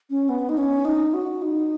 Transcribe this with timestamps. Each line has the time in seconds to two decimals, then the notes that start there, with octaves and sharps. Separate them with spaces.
0.10 C#4
0.29 B3
0.49 D#4
0.57 C#4
0.85 D#4
1.14 F#4
1.42 D#4